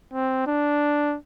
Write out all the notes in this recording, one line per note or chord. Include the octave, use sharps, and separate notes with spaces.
C4
D4